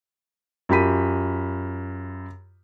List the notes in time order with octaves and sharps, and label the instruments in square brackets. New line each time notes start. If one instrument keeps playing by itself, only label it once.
[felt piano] F#2 F4 G4 B5 B6 D#7